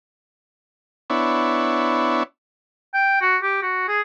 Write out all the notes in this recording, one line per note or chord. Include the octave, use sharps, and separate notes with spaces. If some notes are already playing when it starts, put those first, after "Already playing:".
B3 D4 E4 C#5
G5
F#4
G4
F#4
G#4